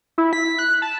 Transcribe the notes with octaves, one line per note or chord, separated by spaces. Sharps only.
E4
B6
F#6
A5